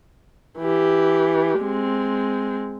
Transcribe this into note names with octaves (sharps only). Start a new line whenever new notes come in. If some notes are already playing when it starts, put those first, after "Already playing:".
E3 G4
G#3 C4